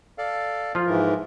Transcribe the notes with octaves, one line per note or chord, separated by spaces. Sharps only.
A4 D5 F5
F3 F4
G#2 E3 A#4